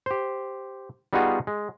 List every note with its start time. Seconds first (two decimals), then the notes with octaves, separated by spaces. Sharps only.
0.06 G4 C5
1.13 G3 B3 D#4 F4 F#4 G#4
1.47 G#3